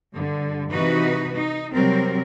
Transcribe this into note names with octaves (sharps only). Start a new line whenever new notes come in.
G2 D3
C3 E3 D#4 F#4 B4
D#4
C3 F#3 G3 C4 A#4